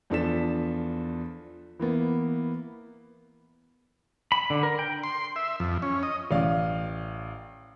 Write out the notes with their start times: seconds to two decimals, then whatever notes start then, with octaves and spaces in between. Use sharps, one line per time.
0.10 E2 F3 D4 A4 B6 E7
1.79 E3 A#3 B3
4.32 B5
4.50 D3
4.63 A#4
4.79 G5
5.03 C6
5.36 E5
5.60 F2
5.82 C#4
6.03 D#5
6.31 A1 D5 F5